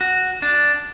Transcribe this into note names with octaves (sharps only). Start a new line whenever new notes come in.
F#4
D4